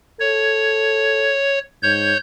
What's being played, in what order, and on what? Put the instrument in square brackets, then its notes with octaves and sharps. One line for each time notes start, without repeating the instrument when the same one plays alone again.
[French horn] A4 [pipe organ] C#5
[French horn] G#2 [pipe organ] C#5 G6